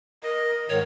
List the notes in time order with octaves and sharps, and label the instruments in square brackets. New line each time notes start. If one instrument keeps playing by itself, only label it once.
[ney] A#4 [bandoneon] D#5
[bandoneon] G#2 D#3 [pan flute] C#5